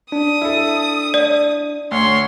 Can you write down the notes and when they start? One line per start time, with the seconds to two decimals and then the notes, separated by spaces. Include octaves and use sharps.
0.12 D4 D#6
0.41 E4 A4
1.14 D5
1.91 D2 C#5 C6